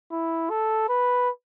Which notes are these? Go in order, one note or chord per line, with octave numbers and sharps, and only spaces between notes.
E4
A4
B4